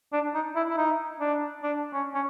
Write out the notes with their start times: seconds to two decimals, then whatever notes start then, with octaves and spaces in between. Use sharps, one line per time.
0.13 D4
0.34 D#4
0.56 E4
0.70 E4
0.77 D#4
1.20 D4
1.63 D4
1.93 C#4
2.15 C#4